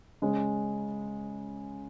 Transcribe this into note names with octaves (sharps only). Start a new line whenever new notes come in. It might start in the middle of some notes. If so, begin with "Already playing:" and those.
C#3 G#3 C#4 G#4